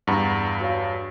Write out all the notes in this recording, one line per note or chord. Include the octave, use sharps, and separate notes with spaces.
E2 G2 F#5 A#5 B5
F#4 C#5 F5